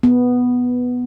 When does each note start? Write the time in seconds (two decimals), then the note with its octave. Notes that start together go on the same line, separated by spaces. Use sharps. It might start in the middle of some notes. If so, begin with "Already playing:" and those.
0.03 B3